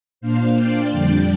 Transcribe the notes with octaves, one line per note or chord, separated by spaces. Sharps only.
A#2 A#3 D4 C5 F5
D5 G5
F2 D3 G3 D4